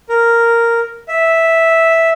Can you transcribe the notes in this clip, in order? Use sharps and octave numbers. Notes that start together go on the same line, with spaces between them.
A#4
E5